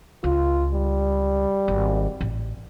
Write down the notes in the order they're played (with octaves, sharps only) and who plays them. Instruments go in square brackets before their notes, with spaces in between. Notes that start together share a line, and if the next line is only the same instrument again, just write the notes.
[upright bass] C#2 [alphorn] F4
[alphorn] G3
[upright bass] G#1
A1